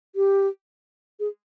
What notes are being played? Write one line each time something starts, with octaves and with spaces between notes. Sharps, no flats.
G4
G#4